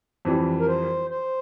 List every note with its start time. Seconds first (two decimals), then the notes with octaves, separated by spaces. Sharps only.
0.25 F2 E3 G3
0.60 A#4
0.68 C5
1.10 C5